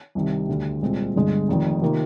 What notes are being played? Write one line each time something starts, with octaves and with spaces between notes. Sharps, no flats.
C2 C3 D#3
D2 D3 G3
C2 A#2 G#3 C4
G1 G2 D3 G#3
F1 F2 D#3
C3 D#3 A#3 F4